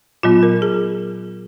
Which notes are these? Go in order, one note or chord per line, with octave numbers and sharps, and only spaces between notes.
A#2 F#3 B3 F4
A#4
G#4